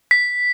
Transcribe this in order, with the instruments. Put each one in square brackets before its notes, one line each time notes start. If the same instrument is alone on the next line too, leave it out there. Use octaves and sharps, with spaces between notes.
[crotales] B6